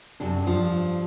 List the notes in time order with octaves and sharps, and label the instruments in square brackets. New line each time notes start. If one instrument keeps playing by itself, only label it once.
[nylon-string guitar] F#2 C3 D4
G2 F3